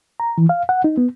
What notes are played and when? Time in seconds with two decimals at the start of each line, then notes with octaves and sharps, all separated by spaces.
0.20 A#5
0.38 E3
0.49 F5
0.69 F#5
0.84 D#4
0.97 B3